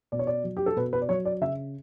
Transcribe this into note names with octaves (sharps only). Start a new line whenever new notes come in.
B2 D5
C#5
D5
F#3
G4
A4
B2 B4
B4
D5
F#3 C#5
D5
C#3 E5